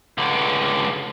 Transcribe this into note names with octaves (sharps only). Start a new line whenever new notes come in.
C#2 D3